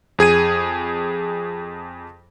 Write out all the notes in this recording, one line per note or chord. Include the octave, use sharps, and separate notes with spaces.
F2 G#4 G#6 D#7